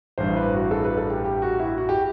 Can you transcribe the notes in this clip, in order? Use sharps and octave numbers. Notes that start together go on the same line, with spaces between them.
A1 G2 E3 C5
B4
F#4
A4
B4
A4
G4
G4
F#4
E4
F#4
G4